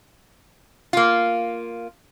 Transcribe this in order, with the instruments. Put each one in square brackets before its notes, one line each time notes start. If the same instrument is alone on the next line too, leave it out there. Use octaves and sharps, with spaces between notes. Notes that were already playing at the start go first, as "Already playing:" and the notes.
[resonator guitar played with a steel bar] A#3 F4